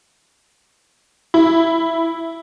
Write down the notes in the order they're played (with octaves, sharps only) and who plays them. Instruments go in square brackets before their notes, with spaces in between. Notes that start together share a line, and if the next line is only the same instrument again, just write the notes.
[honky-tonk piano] E4